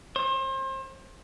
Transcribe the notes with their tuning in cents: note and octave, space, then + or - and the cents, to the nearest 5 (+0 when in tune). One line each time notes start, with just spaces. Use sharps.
C5 +35